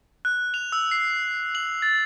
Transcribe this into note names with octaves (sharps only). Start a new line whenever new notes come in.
F#6
F7
E6
C7
F#7
A6